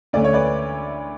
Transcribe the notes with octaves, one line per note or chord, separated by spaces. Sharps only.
D2 D3 A3 C#4 D5
C#5
B4 D5